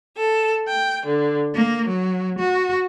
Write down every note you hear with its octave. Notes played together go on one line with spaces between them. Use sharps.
A4
G5
D3
A#3
F#3
F#4